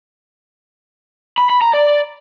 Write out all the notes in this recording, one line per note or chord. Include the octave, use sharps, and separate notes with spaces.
B5
B5
A#5
D5